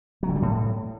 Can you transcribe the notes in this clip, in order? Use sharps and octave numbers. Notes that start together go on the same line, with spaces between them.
F#3
D3
G3
A2